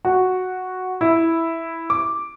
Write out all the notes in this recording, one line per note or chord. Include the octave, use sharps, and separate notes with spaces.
F#4
E4
D6